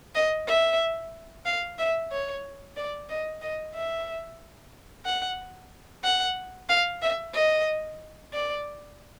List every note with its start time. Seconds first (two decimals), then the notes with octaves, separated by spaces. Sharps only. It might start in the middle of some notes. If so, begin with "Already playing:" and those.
0.15 D#5
0.48 E5
1.46 F5
1.78 E5
2.12 C#5
2.77 D5
3.09 D#5
3.41 D#5
3.74 E5
5.06 F#5
6.04 F#5
6.69 F5
7.02 E5
7.34 D#5
8.33 D5